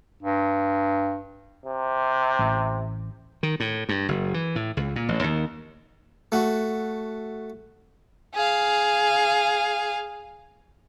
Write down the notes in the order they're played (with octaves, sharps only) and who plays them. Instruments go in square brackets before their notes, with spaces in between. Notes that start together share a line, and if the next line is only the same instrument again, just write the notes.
[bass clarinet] G2
[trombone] C3
[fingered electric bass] A1
[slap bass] D#3
A2
G2
F#1
E3
A2
C#2
A#2
A1
D#2
[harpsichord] A3 F#4
[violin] G#4 F5